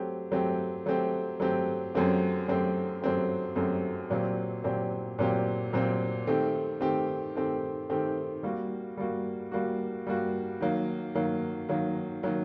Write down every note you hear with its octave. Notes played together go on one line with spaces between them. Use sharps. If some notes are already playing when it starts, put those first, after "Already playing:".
Already playing: F#3 A3 C4 G4
F#3 A3 C4 G4
F#3 A3 C4 G4
F#3 A3 C4 G4
F#2 F#3 A3 C4 G4
F#2 F#3 A3 C4 G4
F#2 F#3 A3 C4 G4
F#2 F#3 A3 C4 G4
A#2 F#3 C4 G4
A#2 F#3 C4 G4
A#2 F#3 C4 G4
A#2 F#3 C4 G4
D#3 A3 C4 G4
D#3 A3 C4 G4
D#3 A3 C4 G4
D#3 A3 C4 G4
G3 A#3 F#4
G3 A#3 F#4
G3 A#3 F#4
G3 A#3 F#4
D#3 F#3 A#3
D#3 F#3 A#3
D#3 F#3 A#3
D#3 F#3 A#3